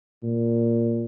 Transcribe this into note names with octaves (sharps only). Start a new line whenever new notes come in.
A#2